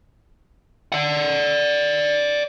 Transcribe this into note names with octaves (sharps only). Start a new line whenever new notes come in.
D5 F#5